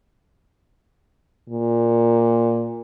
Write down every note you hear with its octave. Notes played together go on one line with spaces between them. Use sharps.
A#2